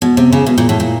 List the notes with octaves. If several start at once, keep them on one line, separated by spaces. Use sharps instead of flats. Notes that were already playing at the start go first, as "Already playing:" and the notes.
B2
C3
C#3
B2
A#2
A2
A#2